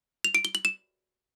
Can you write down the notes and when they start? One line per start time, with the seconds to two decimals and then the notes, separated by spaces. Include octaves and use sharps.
0.24 F7
0.35 D7
0.45 G7
0.55 F#7
0.65 E7